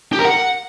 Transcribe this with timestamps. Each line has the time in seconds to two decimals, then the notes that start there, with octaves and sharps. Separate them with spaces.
0.13 G4
0.19 A#4
0.25 F#5